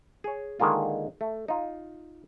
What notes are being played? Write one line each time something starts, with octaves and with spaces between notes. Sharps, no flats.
G#4 C#5
D3 D#3 G#3 A#3 F4
A3
D#4 F4